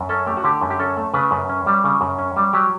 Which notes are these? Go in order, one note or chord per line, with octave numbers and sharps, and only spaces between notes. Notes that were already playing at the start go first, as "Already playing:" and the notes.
Already playing: F#2
C#4 A4
A3 G4
F#4
D3 G4
F#2
G4
C#4 A4
A3
C#3 B4
F#2
C#4
G3
C#3
F#2
C#4
G3
F#3 G4